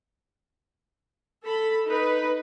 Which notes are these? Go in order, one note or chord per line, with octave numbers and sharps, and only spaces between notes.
A4 B5
D#4 B4